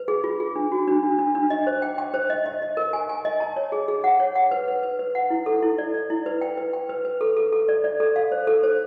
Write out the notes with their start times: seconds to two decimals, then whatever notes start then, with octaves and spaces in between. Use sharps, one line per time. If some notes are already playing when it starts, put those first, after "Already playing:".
Already playing: B4
0.08 G#4
0.24 F4
0.40 G#4
0.56 D4
0.72 F#4
0.88 D4
1.03 D4
1.19 D4
1.35 D4
1.50 D#5
1.67 C5
1.82 G5
1.98 G5
2.14 C5
2.30 D#5
2.46 D#5
2.62 D#5
2.77 A#4
2.93 G#5
3.09 G#5
3.25 D#5
3.40 A5
3.56 C#5
3.72 G#4
3.88 G#4
4.04 F#5
4.20 C#5
4.36 F#5
4.51 B4
4.68 B4
4.83 B4
4.99 B4
5.15 F#5
5.30 E4
5.46 A4
5.63 E4
5.78 D5
5.94 D5
6.10 E4
6.26 B4
6.41 G5
6.57 B4
6.73 G5
6.89 B4
7.05 B4
7.21 A4
7.37 A4
7.52 A4
7.69 D5
7.84 D5
8.00 A4
8.16 F5
8.32 C5
8.47 A4
8.63 C5